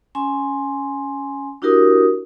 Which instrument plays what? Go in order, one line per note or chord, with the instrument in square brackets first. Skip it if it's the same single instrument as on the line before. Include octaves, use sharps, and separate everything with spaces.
[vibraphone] C#4 G#5 C6
D4 E4 F#4 G4 A#4 D#6